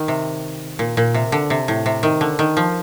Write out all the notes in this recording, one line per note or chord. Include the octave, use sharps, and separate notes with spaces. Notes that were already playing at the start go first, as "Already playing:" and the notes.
Already playing: D#3
C3
A#2
A#2
C3
D3
C3
A2
C3
D#3
D3
D#3
F3